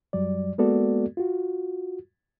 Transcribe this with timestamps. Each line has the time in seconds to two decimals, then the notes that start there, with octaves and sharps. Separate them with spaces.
0.13 F#2 F#3 G3 D5
0.58 G#3 A#3 B3 F#4 A4 D5
1.17 F4 F#4